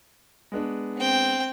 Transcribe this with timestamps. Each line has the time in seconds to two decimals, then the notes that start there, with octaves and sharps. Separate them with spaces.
0.52 G#3 B3 D4
0.97 C4 G5